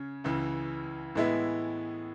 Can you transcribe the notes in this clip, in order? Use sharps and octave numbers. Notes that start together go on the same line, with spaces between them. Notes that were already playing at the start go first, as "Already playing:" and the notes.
Already playing: C#3 C#4
C#2 C#3 E3
A2 E3 G#3 B3 E4